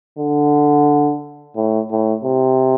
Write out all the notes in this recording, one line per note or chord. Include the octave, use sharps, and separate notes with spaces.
D3
A2
A2
C3